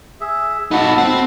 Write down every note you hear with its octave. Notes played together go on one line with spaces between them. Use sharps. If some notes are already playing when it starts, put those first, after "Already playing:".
G#4 E5
D#4 F#4 A4 F#5 B5
C4